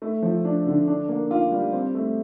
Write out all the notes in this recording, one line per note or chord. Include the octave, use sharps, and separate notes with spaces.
A3
F3
D4
D3
D4
A#3
F4
G3
C4
A3